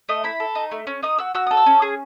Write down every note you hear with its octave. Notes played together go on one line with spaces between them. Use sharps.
A3 D#5
E4 B5
A4
D#4
A3
C#4
D#4 D#6
F#4 E6
F#4 E6
A4 D#6
E6
C#4
G#4